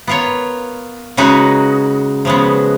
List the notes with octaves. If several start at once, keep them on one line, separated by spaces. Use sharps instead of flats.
B3 F4 A#4 C#5
C#3 G#3 D#4 F#4 B4
C#3 F3 G#3 B3 F#4